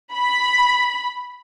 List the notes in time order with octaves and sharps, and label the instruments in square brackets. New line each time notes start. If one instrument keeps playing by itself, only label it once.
[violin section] B5